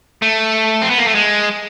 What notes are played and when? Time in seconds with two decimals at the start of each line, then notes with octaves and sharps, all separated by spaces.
0.22 A3
0.82 C4
0.90 B3
0.98 A#3
1.07 A3
1.15 G#3